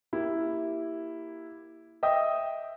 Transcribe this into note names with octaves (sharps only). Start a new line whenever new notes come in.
A#3 E4 G4
D#5 E5 G5 D#6